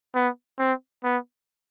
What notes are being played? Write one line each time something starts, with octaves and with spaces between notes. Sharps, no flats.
B3
C4
B3